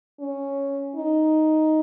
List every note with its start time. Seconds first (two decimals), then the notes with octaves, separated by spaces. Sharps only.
0.20 C#4
0.96 D#4